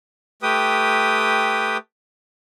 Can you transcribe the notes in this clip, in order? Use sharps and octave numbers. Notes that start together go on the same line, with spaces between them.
A3 G4 B4 G5 D#6